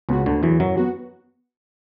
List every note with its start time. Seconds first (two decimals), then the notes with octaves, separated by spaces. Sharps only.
0.09 C#2 C#3 B3 F#4
0.26 D2 D3
0.43 E2 E3 F#3
0.60 F#2 F#3
0.77 B3 F#4